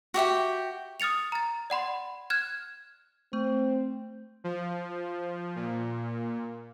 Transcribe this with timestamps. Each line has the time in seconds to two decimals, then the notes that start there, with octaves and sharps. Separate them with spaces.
0.14 F#4 G4 E5 G5
1.00 D#6 F6 A6 C#7 F7
1.32 A#5 A6
1.70 D5 F#5 B5 C6
2.30 F6 F#6 G#6 E7
3.33 A3 C4
4.44 F3
5.56 A#2